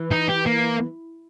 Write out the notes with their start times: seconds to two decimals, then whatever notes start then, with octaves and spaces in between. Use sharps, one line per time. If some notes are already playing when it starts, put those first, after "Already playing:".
Already playing: E3
0.11 D#4
0.29 G4
0.46 A#3